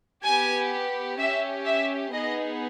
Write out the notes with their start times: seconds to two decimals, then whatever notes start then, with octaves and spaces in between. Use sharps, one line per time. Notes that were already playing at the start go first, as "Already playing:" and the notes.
0.24 B3 G4 G#5
1.18 C#4 G4 E5
1.66 E5
2.12 B3 D#4 G#4 D#5